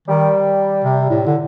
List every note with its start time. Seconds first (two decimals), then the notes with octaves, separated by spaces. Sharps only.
0.08 D#3 G3
0.84 C3
1.10 A2
1.27 D3